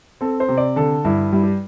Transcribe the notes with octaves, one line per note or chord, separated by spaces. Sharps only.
C4 A4
C5
C3
D5
D3 A4
G2 E4
G3 E4
G4